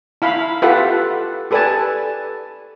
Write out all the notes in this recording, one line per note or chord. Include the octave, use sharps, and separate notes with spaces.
E4 F5 B5
F4 G4 A4 B4 E5 F#5
G4 A4 B4 D5 G#5 A5